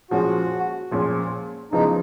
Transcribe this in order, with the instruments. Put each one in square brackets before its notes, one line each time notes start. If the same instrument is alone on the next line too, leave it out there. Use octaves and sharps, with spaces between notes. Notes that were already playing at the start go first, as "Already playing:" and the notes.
[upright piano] A#2 F3 G#3 C#4 [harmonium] F#4
[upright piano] A#2 F3 G#3 C#4
[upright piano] E2 C#3 F3 G#3 [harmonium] D#4